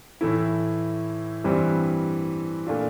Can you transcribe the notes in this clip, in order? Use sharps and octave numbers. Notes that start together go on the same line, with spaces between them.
A2 E3 A3 E4
G2 E3 G3 C4
A#2 A3 D4 F4